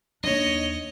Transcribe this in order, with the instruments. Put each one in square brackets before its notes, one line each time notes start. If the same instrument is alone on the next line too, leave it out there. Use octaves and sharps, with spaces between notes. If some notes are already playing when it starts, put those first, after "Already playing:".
[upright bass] D#2 D4 [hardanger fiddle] C#5 D#5